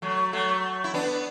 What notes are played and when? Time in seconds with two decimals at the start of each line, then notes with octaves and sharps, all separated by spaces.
0.02 F#3 A3
0.33 F#3 A3
0.84 E4
0.94 B3 D4